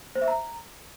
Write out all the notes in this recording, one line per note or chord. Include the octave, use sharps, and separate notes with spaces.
C5
E5
A#5